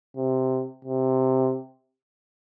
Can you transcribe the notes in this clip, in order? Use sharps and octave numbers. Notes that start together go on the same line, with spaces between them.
C3
C3